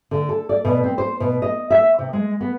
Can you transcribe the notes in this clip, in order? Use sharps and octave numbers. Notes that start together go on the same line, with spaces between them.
D3
A4
D5
B2
C4
C5
B2
D#5
E5
C3
G#3
B3